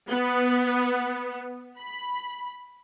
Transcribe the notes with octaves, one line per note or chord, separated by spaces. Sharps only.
B3
B5